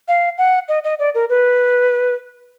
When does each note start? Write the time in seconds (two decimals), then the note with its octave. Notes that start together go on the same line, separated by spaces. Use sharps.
0.08 F5
0.38 F#5
0.69 D#5
0.84 D#5
0.99 D5
1.15 A#4
1.29 B4